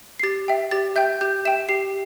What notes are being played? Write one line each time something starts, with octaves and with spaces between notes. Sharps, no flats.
C7
G4 A6
E5 G5
G4 A6
E5 G5 G6
G4 G6
E5 G5 E7
G4 C7